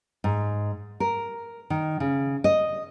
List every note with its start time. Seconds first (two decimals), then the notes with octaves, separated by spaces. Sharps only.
0.24 G#2
1.00 A#4
1.70 D#3
2.00 C#3
2.44 D#5